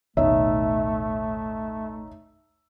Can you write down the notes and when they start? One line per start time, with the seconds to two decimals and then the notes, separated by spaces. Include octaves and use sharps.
0.17 A1 D#2 B2 A3 D#4 C#5 E5